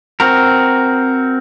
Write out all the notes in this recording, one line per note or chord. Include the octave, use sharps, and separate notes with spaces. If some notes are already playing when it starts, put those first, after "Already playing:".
C4 F#4 A#4